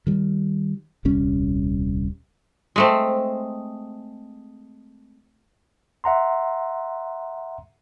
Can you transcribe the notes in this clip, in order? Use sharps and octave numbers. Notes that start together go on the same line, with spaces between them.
D#3 G3
D#1 C2 G3 C#4
G#3 A3 C4
E5 F#5 A#5 C6